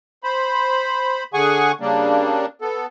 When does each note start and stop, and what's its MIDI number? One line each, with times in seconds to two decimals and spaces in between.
0.24 1.24 72
0.24 1.24 83
1.34 1.72 50
1.34 1.72 68
1.34 1.72 78
1.34 1.72 80
1.34 1.72 85
1.80 2.46 49
1.80 2.46 55
1.80 2.46 58
1.80 2.46 62
2.61 2.86 59
2.61 2.86 69